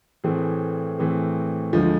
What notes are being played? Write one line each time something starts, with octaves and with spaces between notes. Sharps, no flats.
A2 E3 A3 C4 G#4
A2 E3 A3 C4 G#4
D2 D3 F3 G#3